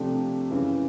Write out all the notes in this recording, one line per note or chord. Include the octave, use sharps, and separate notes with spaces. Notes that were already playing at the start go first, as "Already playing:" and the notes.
Already playing: C3 F3 A3 D4 G4
F#2 C#3 E3